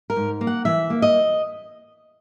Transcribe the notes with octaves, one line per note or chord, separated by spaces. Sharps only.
A#4
G#2
A#3
F#5
E3 E5
A#3
D#5